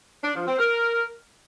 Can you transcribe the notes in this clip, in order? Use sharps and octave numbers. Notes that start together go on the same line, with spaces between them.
D4
F3
C4
A#4